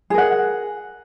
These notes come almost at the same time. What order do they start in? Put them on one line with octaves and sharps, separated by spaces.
G#4 A#4 F#5